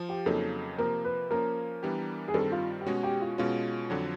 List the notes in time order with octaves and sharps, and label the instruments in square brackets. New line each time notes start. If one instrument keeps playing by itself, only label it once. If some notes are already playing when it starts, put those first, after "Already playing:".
Already playing: [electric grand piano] F3
[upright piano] G4
[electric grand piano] F2 C#3 F#3 A#3 D#4 [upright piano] A4
[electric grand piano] C3 F3 A#3 [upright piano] A#4
[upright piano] B4
[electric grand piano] F3 A#3 C#4 [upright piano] A#4
[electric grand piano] E3 G3 B3 D4 G4
[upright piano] G#4
[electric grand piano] G2 D#3 G3 C4 [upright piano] A4
[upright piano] F4
G4
[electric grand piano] B2 G#3 C#4 F#4 [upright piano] G#4
[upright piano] G4
F4
[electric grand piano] B2 G#3 C#4 [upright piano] F4
[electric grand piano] F2 D3 F#3